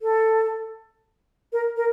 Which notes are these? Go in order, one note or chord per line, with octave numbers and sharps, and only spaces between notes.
A4
A#4
A#4